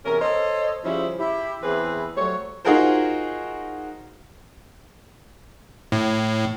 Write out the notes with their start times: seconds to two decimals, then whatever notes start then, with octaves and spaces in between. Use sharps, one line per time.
0.05 E2 C3 C#4 A#4
0.21 A4 C5 C#5 D#5
0.84 C#3 F3 G3 C#4 E4 C5
1.19 E4 G4
1.63 E2 E3 C4 E4 G#4 B4
2.16 F#3 G3 A3 C5 C#5
2.65 D#4 F4 F#4 G#4 A#4 C5
5.92 A2